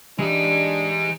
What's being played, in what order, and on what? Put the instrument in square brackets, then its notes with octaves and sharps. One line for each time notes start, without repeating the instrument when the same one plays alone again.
[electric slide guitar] E3 G4 [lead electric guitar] G#3 D#4 [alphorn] D4